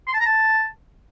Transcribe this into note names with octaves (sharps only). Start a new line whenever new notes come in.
C6
A5
A#5
A5